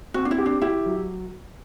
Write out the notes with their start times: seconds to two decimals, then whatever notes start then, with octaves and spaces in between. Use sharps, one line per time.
0.14 C4 F#4
0.25 D4
0.31 E4
0.38 G4
0.46 D4
0.61 E4 G4
0.86 F#3